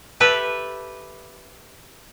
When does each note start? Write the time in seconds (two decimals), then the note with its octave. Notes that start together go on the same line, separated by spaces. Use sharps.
0.20 G4 A4 B4 E5